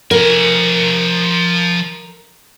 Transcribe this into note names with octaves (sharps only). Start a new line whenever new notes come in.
F3 A#4 G#5